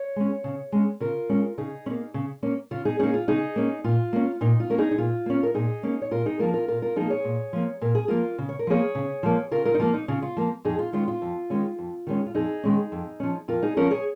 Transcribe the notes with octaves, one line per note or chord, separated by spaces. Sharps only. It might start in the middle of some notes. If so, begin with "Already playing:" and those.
Already playing: C#5
G#3 C#4
C#3
G#3 C#4
C#3 F4 A#4
G#3 C#4
C#3 D#4 G#4
C#4
A#3
C#3
A#3 C#4
C#3 F4
D#4 G#4
A#3 C#4 D#4 G#4
F4
C#3 D#4 G#4
A#3 C#4
A#2 F4
A#3 C#4
A#2 D#4
F4
A#3 C#4 A#4
D#4 G#4
D#4
A#2 F4
A#3 C#4
A#4
A#2 D#4 G#4
A#3 C#4
C#5
A#2 F4 A#4
D#4 G#4
F3 A#3 F4 A#4
F4 A#4
A#2 F4 A#4
F4 A#4
F3 A#3 D#4 G#4
G#4 C#5
A#2
F3 A#3
A#2 A#4
G#4
F3 A#3 F4 A#4
C#3
C#5
A#4
F3 A#3 G#4 C#5
C#3
F3 A#3
C#3 F4 A#4
F4 A#4
D#4
F3 A#3 F4
D#4
C#3 F4
F4
F3 A#3
F2 D#4 G#4
F4
D#3 G#3 C#4 F4
F4
F2
D#3 G#3 C#4
F2
D#3 G#3 C#4
F4
F2 D#4 G#4
D#3 G#3 C#4
F2
F3 C#4
F2 F4 A#4
D#4 G#4
F3 C#4 F4 A#4
G#4 C#5